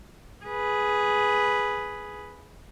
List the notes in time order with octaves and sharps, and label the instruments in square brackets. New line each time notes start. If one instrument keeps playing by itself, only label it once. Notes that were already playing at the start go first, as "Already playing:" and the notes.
[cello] G#4 B4